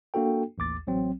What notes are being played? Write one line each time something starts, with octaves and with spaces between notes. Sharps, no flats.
A#3 D4 F#4 A4 G5
A1 D#2 D6 A6
A1 F#3 C4